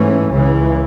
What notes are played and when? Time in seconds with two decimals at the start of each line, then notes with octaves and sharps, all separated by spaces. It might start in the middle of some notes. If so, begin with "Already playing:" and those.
Already playing: G#2 E3 A3 C#4
0.31 C#2 C#3 E3